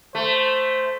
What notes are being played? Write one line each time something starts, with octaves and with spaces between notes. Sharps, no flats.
A3 C5